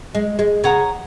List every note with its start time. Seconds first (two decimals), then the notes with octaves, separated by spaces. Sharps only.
0.15 G#3
0.39 G#3
0.64 C#3 C#5 F#5 A#5 D#6